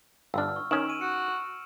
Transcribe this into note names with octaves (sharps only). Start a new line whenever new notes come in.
G1 D4 E6 F6
C#6
D#3 C#4 D7 E7 F#7
E6 D#7
F#4 C#7